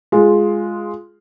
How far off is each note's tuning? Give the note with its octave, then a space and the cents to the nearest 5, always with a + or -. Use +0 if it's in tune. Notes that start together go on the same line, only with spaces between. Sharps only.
G#3 +0 F4 +0